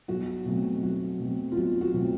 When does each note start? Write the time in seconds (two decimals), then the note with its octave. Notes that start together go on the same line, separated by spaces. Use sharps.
0.08 B1 F#4
0.46 B2 F#3 A3 C4
0.83 B1 F#4
1.20 B2 F#3 A3 C4
1.52 F4
1.56 B1 F#4
1.81 F#4
1.94 B2 F#3 A3 C4